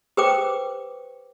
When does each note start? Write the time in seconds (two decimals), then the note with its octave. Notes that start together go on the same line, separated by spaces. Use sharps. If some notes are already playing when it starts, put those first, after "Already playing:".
0.17 G4 B4 C5 G5 D6